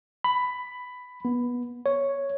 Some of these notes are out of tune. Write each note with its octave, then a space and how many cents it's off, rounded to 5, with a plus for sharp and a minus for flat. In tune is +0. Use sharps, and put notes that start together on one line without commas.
B5 +10
B3 -20
C#5 +0